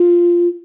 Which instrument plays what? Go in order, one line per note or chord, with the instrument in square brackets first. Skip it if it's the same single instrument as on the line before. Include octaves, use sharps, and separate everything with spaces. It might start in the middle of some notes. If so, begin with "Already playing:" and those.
Already playing: [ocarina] F4